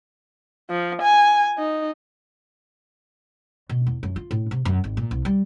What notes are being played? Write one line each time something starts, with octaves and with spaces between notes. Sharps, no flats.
F3
G#5
D#4
B2
E2
F#2
F4
A2
C3
F#2
G#1
A#2
C2
G3